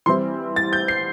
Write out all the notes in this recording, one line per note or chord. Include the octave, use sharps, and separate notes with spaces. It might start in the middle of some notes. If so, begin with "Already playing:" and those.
E3 G3 C4 E4 C6
A6
G6
C7